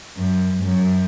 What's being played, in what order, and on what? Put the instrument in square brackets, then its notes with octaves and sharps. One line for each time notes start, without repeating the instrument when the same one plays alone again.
[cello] F#2
F#2